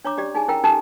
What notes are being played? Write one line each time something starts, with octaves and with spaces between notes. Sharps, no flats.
D4 C#5 A#5 D6
C#4 G4 D5
D#4 G#4 G#5
C#4 E4 A#4 G5 A#5
C#4 D#4 G4 A4 G#5 A5